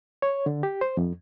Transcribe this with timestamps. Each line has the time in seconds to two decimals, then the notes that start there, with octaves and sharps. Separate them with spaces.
0.22 C#5
0.46 D3
0.63 G4
0.81 C5
0.97 F2